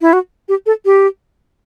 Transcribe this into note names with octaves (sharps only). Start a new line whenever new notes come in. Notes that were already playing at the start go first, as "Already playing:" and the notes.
E4
F#4
G4
A4
G4